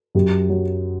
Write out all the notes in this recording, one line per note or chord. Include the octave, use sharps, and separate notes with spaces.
F#2 G4
F#3